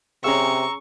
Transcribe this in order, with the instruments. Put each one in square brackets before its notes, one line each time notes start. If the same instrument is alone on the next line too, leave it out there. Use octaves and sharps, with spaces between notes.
[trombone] C3 [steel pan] C#4 G#4 F5 [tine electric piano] A#5 E6 [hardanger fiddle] C#6